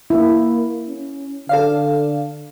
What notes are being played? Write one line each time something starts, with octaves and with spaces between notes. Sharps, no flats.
A#3 E4
C#4
D3 A4 D5 F5